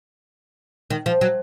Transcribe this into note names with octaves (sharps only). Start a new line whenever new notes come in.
D#3
F3
F#3